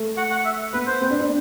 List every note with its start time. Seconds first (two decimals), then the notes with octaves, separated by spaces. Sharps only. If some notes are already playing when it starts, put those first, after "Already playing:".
Already playing: A3
0.17 F#5
0.30 F#5
0.45 E5
0.73 B3 B4
0.87 C5
1.01 C4
1.10 D4
1.20 D4